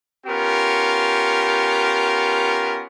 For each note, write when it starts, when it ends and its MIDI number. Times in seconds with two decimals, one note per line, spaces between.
0.26 2.83 59
0.26 2.83 61
0.26 2.83 65
0.26 2.83 67
0.26 2.83 70